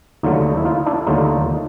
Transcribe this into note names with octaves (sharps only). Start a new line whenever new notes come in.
D#2 D3 F#3 A3 D#4 F4
D#4
E4
D#4 F4
D4 E4
D#2 D3 F#3 A3 D#4 F4